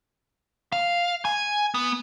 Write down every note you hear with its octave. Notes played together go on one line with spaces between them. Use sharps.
F5
G#5
B3